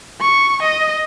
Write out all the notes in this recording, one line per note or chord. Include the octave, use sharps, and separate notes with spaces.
C#6
D#5